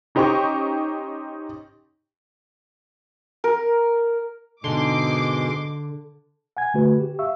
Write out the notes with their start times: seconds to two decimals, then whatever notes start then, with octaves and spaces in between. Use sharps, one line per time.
0.15 C#4 D#4 G4 C5 G5 C#6
3.44 A#4
4.64 G#2 B2 D3 G#3 C6 D6
6.57 F#5 G#5 G#6
6.74 D3 A3 F#4 B4
7.00 G4
7.19 E5 F5 C#6 E6